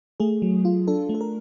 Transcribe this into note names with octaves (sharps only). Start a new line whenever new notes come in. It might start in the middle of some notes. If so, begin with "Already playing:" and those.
A3 G#4
F#3
F4
D4 A4
A3
A4
A#4